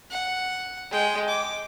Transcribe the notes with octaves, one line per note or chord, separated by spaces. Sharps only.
F#5
G#3 G5
D6